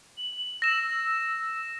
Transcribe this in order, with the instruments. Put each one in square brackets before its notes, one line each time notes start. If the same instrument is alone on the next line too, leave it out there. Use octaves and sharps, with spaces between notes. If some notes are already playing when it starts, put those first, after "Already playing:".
[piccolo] F#7
[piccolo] E6 [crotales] A#6 E7